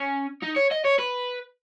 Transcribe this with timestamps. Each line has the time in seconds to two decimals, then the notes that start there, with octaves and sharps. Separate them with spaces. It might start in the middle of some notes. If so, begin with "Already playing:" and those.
Already playing: C#4
0.43 D#4
0.56 C#5
0.71 D#5
0.85 C#5
0.99 B4